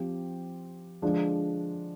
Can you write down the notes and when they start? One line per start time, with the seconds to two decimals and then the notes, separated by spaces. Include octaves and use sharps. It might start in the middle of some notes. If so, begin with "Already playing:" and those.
Already playing: F3 C4 G4
1.02 D3 F3 G#3 D4